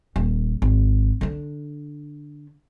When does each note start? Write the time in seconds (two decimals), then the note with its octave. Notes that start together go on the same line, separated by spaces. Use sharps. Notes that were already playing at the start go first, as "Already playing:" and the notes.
0.16 D#1
0.62 G#1
1.21 D3 D4